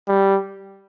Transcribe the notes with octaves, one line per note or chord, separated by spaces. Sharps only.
G3